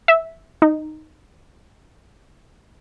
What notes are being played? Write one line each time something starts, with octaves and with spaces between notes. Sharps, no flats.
E5
D#4